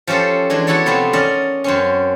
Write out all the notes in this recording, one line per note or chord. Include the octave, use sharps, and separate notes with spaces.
F3 C#4 G4 A4 C5
E3 G#3 D4
B3 E4 F#4 A4 C#5 D5
C3 F3 A3 B3 C4
C#4 D#4 A#4 D5 E5
F#2 C4 C#4